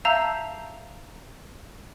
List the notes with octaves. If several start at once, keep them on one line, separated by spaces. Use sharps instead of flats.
E5 F5 A5 A#5 E6 G6